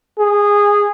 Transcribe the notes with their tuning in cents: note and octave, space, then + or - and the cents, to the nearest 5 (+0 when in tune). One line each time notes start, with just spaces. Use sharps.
G#4 -15